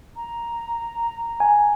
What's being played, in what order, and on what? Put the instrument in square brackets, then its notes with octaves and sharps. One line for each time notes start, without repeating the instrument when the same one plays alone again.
[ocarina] A#5
[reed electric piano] G#5